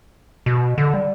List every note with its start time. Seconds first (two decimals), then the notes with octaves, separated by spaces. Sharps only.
0.46 B2
0.78 D3
0.94 G3